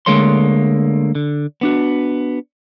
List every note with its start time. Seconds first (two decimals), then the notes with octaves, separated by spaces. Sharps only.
0.06 D2 D3 G#3 A#3 C#5 C6
1.15 D3
1.61 B3 D4 F#4